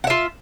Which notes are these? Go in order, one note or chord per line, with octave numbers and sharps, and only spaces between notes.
F4 E5 F#5